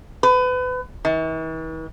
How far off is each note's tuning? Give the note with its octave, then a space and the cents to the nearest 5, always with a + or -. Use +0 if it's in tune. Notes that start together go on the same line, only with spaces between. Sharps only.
B4 +30
E3 -45